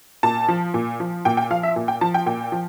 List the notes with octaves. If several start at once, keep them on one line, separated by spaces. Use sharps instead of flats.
A#2 A5
F3
A#2
F3
A#2 G5
G5
F3 F5
E5
A#2
G5
F3 A5
G5
A#2 G5
F3